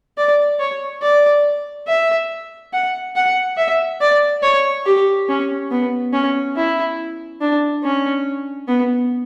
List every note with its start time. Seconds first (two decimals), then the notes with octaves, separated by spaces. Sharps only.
0.18 D5
0.60 C#5
1.02 D5
1.87 E5
2.73 F#5
3.16 F#5
3.57 E5
4.01 D5
4.43 C#5
4.86 G4
5.29 C#4
5.71 B3
6.13 C#4
6.56 E4
7.41 D4
7.84 C#4
8.68 B3